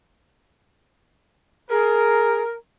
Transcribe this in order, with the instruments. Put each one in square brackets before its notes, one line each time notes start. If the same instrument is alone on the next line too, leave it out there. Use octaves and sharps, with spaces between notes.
[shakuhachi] G#4 [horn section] A#4